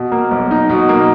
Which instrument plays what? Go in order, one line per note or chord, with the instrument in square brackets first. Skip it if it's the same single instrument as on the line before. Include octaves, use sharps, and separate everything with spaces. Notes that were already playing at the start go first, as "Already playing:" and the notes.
Already playing: [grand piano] B2
A#3
B1
D#4
B2
A#3